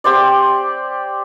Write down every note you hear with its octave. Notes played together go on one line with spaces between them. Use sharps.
C4 G4 C5 D5